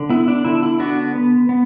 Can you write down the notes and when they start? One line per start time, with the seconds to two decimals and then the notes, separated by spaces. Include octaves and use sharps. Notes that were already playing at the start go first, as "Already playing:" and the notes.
Already playing: D3
0.10 B3 E4
0.28 D4
0.45 D3 E4
0.63 E4
0.80 B3 D4 F#4
1.15 B3
1.49 B3